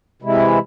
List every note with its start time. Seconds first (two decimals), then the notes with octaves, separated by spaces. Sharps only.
0.22 C3 E3 G#3 E4